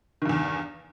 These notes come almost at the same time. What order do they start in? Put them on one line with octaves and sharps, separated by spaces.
D#3 G2 E2